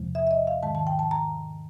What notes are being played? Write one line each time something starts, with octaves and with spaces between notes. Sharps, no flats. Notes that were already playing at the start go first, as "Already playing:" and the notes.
Already playing: E2 C3 F3 G#3
E5
E5
D#5
F5
G#2 D#3 G#3 A5
A5
G5
A5
A#5